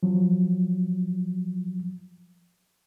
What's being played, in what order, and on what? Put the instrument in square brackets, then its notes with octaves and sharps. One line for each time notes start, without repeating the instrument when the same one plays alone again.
[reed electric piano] F3 F#3